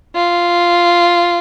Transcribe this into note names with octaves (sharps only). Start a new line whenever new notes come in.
F4